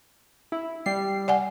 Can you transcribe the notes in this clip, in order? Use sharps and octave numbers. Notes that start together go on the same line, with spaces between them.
E4
G3 C7
D5 F#5 G#5